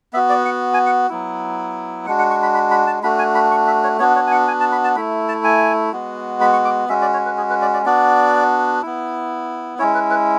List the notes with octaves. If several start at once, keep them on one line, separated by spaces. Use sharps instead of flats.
B3 F#4 E5
D5
F#5
G#5
F#5
F#3 B3 E4
G#3 D4 F#4 F#5
F#5
C#6
B5
B5
B5
A5
A3 D4 F#4 B5
G#5
B5
C#6
E5
C#5
B3 D4 F#4 C#5
C#5
G#5
F#5
G#5
A5
B5
A5
A3 E4 B5
A5
G#5
G#3 B3 F#4
B5
C#6
D6
G#3 C#4 F#4 E5
D5
C#5
B4
G#4
B4
D5
D5
B3 D4 F#4 D5
B3 E4
G#3 C#4 E4 C#5
B4
B4